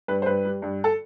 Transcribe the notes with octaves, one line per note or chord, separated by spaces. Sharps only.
G2 B4
C5
G2 B4
G3
G2
A4